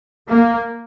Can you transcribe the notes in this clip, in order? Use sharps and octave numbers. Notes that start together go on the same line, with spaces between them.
A#3